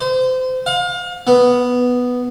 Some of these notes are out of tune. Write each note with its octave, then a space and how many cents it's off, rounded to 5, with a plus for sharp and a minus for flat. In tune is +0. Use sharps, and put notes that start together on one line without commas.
C5 -30
F5 +35
B3 +0